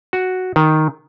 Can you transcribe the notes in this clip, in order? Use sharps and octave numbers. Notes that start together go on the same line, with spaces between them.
F#4
D#3